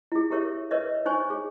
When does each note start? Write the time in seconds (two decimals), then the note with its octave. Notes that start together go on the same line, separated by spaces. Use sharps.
0.12 E4 G#4
0.30 E4 G4 A#4 C#5 E5
0.71 A#4 B4 C#5 D#5 E5
1.06 D#4 C5 C#5 G#5 C#6
1.30 G#4